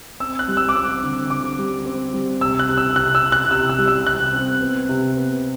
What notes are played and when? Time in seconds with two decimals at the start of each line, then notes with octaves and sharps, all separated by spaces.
0.20 C4 E6
0.39 F#6
0.48 G3
0.57 E6
0.69 D6
0.75 C4 E6
1.03 D3
1.30 D3 D6
1.58 G3
1.86 C4
2.13 G3
2.41 C3 E6
2.59 F#6
2.69 C3
2.77 E6
2.95 C3 F#6
3.15 E6
3.23 C3
3.32 F#6
3.51 C3 E6
3.70 E6
3.78 G3
3.88 E6
4.06 C3 F#6
4.33 C4
4.61 B3
4.89 C3
5.17 B3